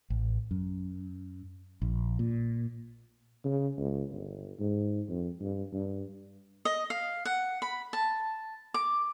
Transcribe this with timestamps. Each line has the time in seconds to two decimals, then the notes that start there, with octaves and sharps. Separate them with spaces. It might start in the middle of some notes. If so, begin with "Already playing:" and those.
0.10 A1
0.51 F#2
1.82 A#1
2.19 A#2
3.45 C#3
3.78 C#2
4.11 G1
4.59 G#2
5.09 F2
5.41 G2
5.72 G2
6.65 D#5
6.90 F5
7.25 F#5
7.62 B5
7.93 A5
8.74 D6